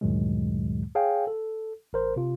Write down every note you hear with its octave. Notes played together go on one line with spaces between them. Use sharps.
D2 G2 A#2 D#3 F#3 G#3
G#4 C#5 F5 G5 G#5
A4
A1 A#4 C5
C3 F4